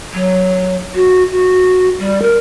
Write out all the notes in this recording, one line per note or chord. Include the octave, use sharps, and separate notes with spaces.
F#3
F#4
F#4
G3
A#4